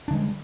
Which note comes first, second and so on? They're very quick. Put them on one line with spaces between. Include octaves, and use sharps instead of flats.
D4 D3 G#3 G3